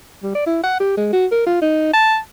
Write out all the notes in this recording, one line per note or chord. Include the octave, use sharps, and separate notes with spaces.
G3
D5
E4
F#5
G4
G#3
F#4
A#4
F4
D#4
A5